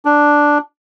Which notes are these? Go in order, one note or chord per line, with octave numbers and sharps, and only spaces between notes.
D4